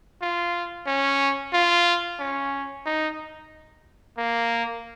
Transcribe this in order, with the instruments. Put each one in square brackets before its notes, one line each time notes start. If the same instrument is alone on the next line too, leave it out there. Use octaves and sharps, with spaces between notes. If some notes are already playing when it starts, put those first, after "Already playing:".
[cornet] F4
C#4
F4
C#4
D#4
A#3